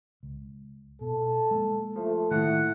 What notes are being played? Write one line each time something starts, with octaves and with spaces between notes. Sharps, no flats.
C#2
B2 A4
G#3 A#3
F3 A3
A2 D#3 A#3 F#5